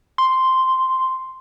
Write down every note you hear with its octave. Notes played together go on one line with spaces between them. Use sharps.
C6